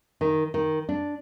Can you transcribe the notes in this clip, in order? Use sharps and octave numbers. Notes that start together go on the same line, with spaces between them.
D#3
D#3
D4